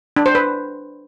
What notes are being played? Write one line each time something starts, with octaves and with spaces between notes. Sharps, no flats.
D4
C5
B4